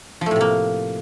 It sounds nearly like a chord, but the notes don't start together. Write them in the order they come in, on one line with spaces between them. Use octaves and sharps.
F3 A3 A2 C3 A#3